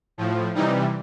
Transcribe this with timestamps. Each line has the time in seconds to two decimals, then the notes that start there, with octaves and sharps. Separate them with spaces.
0.18 A2 F3
0.55 C3 E3 G3 D#4